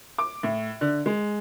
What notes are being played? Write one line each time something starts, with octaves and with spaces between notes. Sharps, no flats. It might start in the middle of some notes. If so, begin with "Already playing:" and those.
D6
A2
D3
G#3